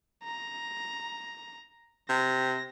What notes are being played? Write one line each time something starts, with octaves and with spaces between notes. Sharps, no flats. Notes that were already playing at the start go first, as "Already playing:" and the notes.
A#5
C3 A#6